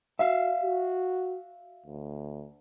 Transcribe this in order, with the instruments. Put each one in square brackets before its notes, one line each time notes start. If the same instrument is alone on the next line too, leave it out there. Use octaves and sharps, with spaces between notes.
[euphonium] F#4 [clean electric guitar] E5 F5
[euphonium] F#4
D2